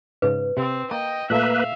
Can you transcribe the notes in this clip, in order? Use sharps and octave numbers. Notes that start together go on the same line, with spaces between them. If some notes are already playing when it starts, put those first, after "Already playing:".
G#2 C#3 B4
C3 C4
A#3 D#5 G5 A#5
A#2 A3 A#3 B4 E5 F5